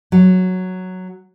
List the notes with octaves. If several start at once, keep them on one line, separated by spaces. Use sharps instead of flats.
F#3